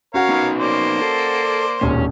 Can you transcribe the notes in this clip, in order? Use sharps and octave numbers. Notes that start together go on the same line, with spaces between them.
C#4 F#4 A#4 C#5 F5 F#5
B3 D#4 B4
A#3 C5 D5
A4
E1 D#2 A#2 C#4